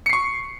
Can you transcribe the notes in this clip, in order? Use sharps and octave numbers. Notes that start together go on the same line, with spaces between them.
C#6 C7 C#7